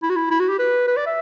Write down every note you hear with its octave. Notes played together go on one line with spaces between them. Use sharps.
E4
F#4
E4
E4
F#4
G4
B4
B4
D5
E5